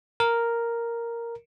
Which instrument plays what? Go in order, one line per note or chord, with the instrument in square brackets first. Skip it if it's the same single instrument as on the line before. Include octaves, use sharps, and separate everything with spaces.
[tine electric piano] A#4